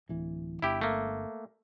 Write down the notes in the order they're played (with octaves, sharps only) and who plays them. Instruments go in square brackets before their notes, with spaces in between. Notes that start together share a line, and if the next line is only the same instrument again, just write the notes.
[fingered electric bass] D1 E3
[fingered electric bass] G1 [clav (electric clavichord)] E4 G4
[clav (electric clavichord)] A3 A#3